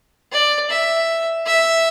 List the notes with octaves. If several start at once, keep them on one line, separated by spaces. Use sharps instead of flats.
D5
E5
E5